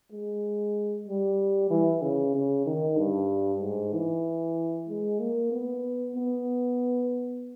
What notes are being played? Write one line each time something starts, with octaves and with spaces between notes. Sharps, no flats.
G#3
G3
E3
C#3
C#3
D#3
G2
G#2
E3
G#3
A#3
B3
B3